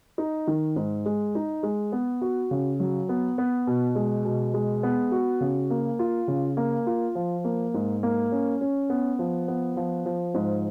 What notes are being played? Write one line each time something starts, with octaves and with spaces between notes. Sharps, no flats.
D#4
D#3
G#2
G#3
D#4
G#3
B3
F#4
C#3
F#3
B3
B3
B2
G#3
B2
G#3
B3
F#4
C#3
A#3
F4
C#3
A#3
F4
F3
A#3
G#2
A#3
C#4
C#4
B3
F3
B3
F3
F3
G#2